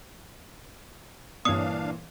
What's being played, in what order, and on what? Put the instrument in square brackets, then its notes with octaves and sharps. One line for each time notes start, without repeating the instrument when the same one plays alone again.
[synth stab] G2 C#5 [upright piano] A#2 E3 [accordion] D4 F5 [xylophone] D#6